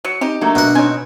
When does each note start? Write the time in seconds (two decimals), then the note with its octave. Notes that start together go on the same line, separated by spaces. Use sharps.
0.05 F#3 C#7
0.21 C4 D#4 G4
0.41 F#3 A3 A#3 D4
0.55 B2 F#5
0.75 C4 D#4 C#5 G#5